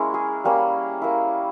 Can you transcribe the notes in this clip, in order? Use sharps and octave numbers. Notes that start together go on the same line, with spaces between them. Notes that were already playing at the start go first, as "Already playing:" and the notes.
Already playing: G#3 A#3 C#4 E4 A#4
G#4
G3 A#3 C#4
A#3 E4